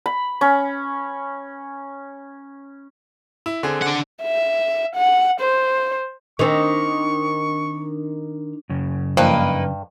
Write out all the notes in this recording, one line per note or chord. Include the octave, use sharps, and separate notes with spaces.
B5
C#4
E4
D3 C4 G#4
D4 F#5
E5
F#5
C5
D#3 C4 D4 C#6
F#2 C#3
G2 F3 A#3 D#4 B4